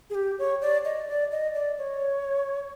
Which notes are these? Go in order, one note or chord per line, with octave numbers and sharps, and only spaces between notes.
G#4
G4
C#5
D5
D#5
D5
D#5
D5
C#5